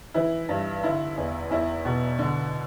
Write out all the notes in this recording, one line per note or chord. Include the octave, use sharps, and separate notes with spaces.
E3 E4
G2
D3 E4
E2
E2 E4
B2
D3